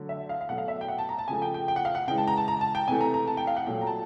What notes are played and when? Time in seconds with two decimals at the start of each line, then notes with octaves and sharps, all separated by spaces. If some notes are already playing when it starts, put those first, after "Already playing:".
Already playing: D3 F#3 A3
0.09 E5
0.29 F5
0.41 F5
0.49 B2 F#3 A3 F#5
0.58 F5
0.68 E5
0.81 G5
0.88 F#5
0.98 A5
1.09 A#5
1.19 A5
1.28 C#3 F3 A3 G#5
1.42 G5
1.54 G5
1.68 G5
1.76 F#5
1.85 F5
1.95 F#5
2.07 C#3 E3 G#3 G5
2.18 A5
2.28 A#5
2.37 A5
2.48 A#5
2.61 A5
2.75 G5
2.87 C3 E3 A3 G#5
3.01 A#5
3.14 A#5
3.27 A5
3.37 G5
3.47 F5
3.57 F#5
3.66 A#2 F#3 A3 G5
3.81 A#5
3.87 A5